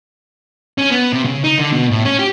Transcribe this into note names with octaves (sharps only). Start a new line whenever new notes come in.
C#4
B3
C3
C#3
D#4
D3
B2
A2
C#4
G4